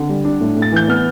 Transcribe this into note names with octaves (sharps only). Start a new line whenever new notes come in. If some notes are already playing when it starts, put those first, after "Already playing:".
Already playing: D3
G3
D4
A2
A2
A6
E3 G6
B3 F6